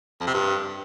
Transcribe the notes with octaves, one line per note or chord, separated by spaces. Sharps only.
F2
C3
G2